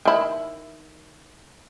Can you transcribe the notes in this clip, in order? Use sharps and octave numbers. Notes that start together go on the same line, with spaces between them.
D#3 E4